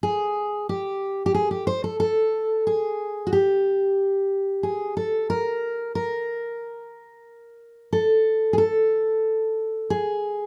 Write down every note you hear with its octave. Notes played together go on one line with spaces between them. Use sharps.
G#4
G4
G4
G#4
G4
C5
A4
A4
G#4
F#4
G4
G#4
A4
A#4
A#4
A4
G#4
A4
G#4